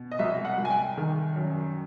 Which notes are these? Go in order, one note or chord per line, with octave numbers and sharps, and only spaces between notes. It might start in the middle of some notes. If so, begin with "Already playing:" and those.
Already playing: B2
D#5
C2 E5
F#5
C2
G#5
G5
D#3
F#2